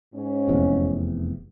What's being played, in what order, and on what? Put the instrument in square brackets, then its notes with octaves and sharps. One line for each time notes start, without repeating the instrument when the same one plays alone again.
[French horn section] G#2 C#4
[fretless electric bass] F1 E2 C3